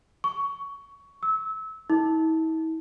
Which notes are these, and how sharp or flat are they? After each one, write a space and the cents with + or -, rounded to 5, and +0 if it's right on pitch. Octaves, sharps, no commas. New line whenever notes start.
C#6 +15
E6 -25
E4 -45